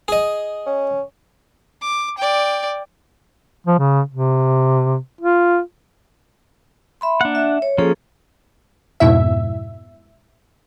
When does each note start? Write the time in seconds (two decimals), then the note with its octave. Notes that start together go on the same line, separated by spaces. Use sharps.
0.08 G#4 D#5
0.66 C#4
1.81 D6
2.18 D5 G5
3.67 F3
3.79 C#3
4.11 C3
5.21 F4
7.01 E5 B5 C6
7.21 A#3 D4 F#5
7.35 E5
7.62 C#5
7.78 F3 A#3 C#4 G#4 A4
9.00 F2 G#2 B2 E4 E5